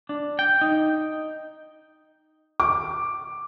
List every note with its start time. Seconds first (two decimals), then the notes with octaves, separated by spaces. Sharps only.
0.09 D4
0.39 G5
0.61 D#4
2.60 D6